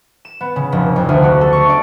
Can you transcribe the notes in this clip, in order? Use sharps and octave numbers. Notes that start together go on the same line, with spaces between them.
E7
B3
C#3
F1
F2
D2
F#4
A4
C#6
D5